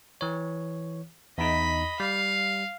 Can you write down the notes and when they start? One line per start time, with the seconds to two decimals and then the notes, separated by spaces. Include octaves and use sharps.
0.21 E3 C#5
1.38 E2 D#4 D#5 B5
2.00 G3 F5